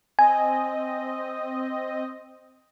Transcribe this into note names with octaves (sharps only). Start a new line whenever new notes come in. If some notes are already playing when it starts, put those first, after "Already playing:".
C4 D#5 G#5